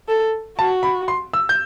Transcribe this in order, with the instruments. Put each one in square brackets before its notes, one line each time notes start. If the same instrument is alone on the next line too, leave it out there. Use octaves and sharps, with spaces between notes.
[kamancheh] A4
[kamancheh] F#4 [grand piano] A5
[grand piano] B5
C6
E6
G6